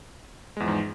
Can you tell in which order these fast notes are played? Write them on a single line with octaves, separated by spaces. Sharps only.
G#3 E2 F3 G#2